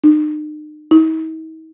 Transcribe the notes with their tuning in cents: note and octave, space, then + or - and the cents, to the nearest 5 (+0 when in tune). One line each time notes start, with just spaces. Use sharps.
D#4 -45
D#4 +45